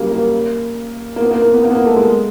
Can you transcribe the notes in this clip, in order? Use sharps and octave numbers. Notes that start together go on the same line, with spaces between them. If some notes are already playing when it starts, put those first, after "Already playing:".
Already playing: C#3 F#3 G3 A#3
A#3
A#3
B3
A#3
A#3
B3
A#3
B3
A#3
A3
G#3